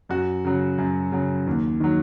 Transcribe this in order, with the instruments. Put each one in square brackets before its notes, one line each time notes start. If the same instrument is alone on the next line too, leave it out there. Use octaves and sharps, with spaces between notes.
[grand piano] F#2 F#4
C#3 F#3
F#2
C#3 F#3
D#2
D#3 F#3